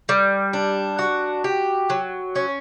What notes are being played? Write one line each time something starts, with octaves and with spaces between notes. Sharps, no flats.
G3
D4
F#4
G4
F#3
C#4